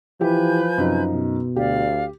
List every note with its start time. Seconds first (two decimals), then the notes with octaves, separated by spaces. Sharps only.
0.21 E3 F3 E4 G4 B4 G#5 G6
0.78 F#2 C3 D#4
1.13 B2
1.56 D2 G4 D5 F5